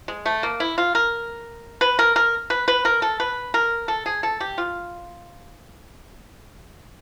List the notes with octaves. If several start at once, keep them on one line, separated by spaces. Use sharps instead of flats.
G#3
A3
A#3
E4
F4
A#4
B4
A#4
A#4
B4
B4
A#4
A4
B4
A#4
A4
G#4
A4
G4
F4